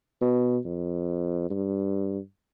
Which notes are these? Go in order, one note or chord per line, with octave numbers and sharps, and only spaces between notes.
B2
F2
G2